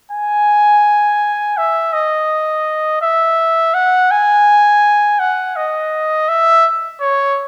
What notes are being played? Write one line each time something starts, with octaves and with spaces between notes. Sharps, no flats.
G#5
E5
D#5
E5
F#5
G#5
F#5
D#5
E5
C#5